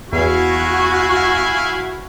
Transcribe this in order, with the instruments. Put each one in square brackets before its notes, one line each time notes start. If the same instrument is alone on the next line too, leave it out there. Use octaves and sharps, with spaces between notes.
[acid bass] E2 [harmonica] E4 F5 G#5 [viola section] F#4